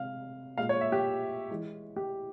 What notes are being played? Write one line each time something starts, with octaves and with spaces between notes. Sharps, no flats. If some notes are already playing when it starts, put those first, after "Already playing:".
Already playing: C3 G#3 F5
A#2 G#3 F5
C#5
E5
G4
E3 G#3
G4